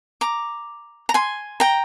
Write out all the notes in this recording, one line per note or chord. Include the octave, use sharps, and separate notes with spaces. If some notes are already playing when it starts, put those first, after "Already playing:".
A#5 D6
A#5
G#5 C6
G5 A#5